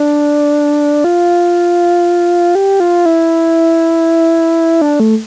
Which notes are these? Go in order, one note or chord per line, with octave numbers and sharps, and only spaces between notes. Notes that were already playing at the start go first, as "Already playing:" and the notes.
Already playing: D4
F4
G4
F4
E4
D4
A3